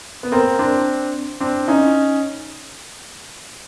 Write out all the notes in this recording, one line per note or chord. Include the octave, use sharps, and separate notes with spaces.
B3
A#3 C4
C4 D4
C4 D4
C#4 D#4